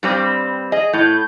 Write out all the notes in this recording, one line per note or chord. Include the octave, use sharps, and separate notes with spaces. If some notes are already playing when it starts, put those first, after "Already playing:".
G2 G3 C4
G#4 D#5
A2 G6